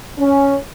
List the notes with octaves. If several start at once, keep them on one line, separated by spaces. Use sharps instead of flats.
C#4